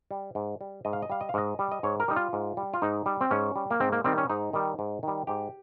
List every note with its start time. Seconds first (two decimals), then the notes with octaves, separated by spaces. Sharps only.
0.11 G3
0.35 G#2
0.61 G3
0.85 G#2 D#5
0.93 F5
1.02 D#5
1.10 G3 F5
1.21 D#5
1.29 F5
1.34 G#2 D#5
1.59 G3
1.72 D#5
1.83 G#2 C#5
2.00 A#4
2.08 G3 D#4
2.16 F4
2.33 G#2
2.57 G3
2.74 F4
2.82 G#2 D#4
3.06 G3
3.21 C4
3.31 G#2 C#4
3.56 G3
3.71 A#3
3.80 G#2 C4
3.92 A#3
4.04 D#3 G3 C4
4.18 C#4
4.30 G#2 D#4
4.53 D#3 G3
4.79 G#2
5.03 D#3 G3
5.27 G#2 G4